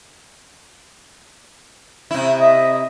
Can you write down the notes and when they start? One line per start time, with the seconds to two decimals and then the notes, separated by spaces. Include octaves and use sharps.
2.11 C3 E4
2.41 D#5 E5